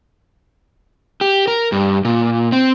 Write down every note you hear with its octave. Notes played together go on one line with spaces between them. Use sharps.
G4
A#4
G2
A#2
C4